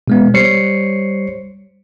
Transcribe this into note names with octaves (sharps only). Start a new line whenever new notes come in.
B2 G#3 B3
G3 C5 C#5 C7 C#7